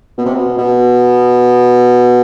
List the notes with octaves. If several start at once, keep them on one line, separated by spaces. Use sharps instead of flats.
B2
C3
B2
B2